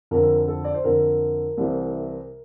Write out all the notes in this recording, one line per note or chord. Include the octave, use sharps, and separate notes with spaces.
F2 D3 A#4
A4
D5
C5
F2 D3 A#4
C2 C3 E3